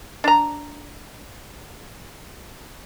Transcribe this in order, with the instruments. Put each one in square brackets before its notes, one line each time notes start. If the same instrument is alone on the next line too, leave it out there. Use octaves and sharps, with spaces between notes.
[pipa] D4 A#5